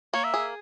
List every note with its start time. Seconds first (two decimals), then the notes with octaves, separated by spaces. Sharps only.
0.14 A#3 C#5
0.24 E5
0.34 G#4